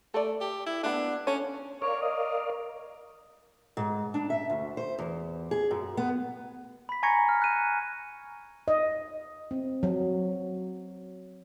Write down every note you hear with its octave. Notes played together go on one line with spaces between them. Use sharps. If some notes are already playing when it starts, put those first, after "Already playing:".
A3 A4 D5
G4
E4
A3 B3 D4
C#4 A4 C#5
A#4 C#5 D5 F5
D#5
G#2
D4
E5
D2
C5
E2
G#4
F#2
B3
B5 B6
G#5 A#5 C#6 G#6 A#6 C#7
F6
F#6 D#7
D#5
C4
F#3